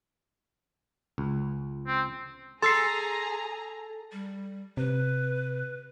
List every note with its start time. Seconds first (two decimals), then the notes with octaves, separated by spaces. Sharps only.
1.18 C#2
1.87 C4
2.62 G#4 A4 A#5 C6 E6 A6 C7
4.12 G3
4.77 C3 B4